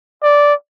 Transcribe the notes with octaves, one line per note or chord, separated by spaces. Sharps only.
D5